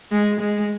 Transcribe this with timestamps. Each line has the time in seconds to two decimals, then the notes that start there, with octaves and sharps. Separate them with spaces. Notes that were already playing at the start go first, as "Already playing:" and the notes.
0.11 G#3
0.40 G#3